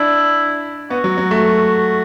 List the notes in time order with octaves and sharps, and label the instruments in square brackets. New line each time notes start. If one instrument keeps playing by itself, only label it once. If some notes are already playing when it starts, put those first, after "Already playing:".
Already playing: [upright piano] D4 [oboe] E4
[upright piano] B3 [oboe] F#4
[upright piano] F#3
F#3
A3